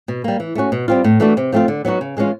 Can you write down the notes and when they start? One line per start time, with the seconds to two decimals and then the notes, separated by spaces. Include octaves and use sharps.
0.08 B2
0.24 G3 A#3
0.40 E3
0.55 A3 C#4 F#4
0.72 B2
0.88 G3 C4 F4
1.04 A2
1.20 E3 A3 D4 F#4
1.37 C3
1.52 F3 A3 C4 F4
1.68 D3
1.85 F#3 B3 D#4 F#4
2.01 C#3
2.17 E3 G#3 C#4 F4